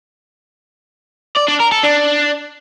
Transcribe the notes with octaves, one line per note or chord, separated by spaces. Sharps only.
D5
D4
A#4
A4
D4